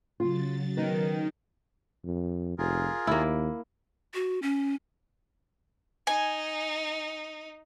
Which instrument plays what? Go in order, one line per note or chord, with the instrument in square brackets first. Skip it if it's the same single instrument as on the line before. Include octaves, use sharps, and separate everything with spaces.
[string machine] C#3 F#3 A6 [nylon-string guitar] F4
[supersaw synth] D#3 [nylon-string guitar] B3
[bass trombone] F2
[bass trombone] F1 [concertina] F4 G#4 A#4
[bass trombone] D#2 [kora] A#3 E4
[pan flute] F#4
C#4
[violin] D#4 [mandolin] G#5